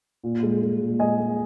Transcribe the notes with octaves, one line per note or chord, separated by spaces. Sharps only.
A#2
G#3
G#3
A#2
G#3 D#5 G#5
G#3